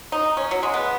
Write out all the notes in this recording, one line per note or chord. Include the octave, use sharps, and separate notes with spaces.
D#4
C#4
F#3
G#3
B3